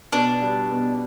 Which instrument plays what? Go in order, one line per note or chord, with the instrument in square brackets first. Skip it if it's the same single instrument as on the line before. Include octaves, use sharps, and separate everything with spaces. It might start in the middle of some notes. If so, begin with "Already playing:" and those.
[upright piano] B2 [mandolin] D4
[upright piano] G3
B2